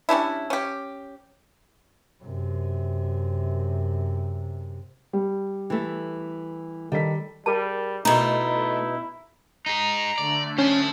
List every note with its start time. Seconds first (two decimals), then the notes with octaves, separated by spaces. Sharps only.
0.09 G3 C#4 D4 E4
0.50 C#4 G4
2.22 F#2 C3
5.13 G3
5.70 E3 A3
6.92 D#3 G3 A4 B6
7.46 G3 G#4 A#4 A5
8.05 B2 A3 D#4 E4 A#5
9.66 D#4 G#4 A#5
10.18 D3 A3 D5
10.58 C#4 C5 A5